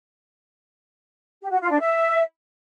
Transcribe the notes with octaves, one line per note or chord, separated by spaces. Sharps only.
G4
F#4
F4
D4
E5